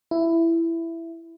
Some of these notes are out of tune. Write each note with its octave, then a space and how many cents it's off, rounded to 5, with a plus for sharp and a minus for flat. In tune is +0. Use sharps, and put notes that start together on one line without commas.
E4 +10